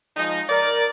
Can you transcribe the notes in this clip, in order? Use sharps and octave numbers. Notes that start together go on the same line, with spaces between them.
F3 G#3 D#4
A#4 D5